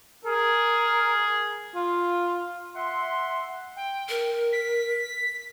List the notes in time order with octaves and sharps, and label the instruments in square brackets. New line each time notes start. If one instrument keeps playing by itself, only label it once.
[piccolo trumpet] G#4 [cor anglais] A#4
[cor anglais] F4
[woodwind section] E5 F#5 C6
[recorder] G5
[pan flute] A#4
[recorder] B6